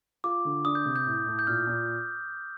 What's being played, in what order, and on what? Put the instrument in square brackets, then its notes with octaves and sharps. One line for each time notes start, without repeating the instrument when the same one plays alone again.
[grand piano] F4 [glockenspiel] D6
[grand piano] D3
[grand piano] D4 [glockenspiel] D#6
[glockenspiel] G6
[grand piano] C3
[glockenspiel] G6
[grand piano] A2
A2
[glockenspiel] G6
[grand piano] A#2 [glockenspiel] F6
[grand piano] A#2